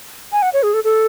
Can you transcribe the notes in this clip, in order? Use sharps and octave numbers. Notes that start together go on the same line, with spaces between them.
G#5
F#5
C#5
G#4
A4
A4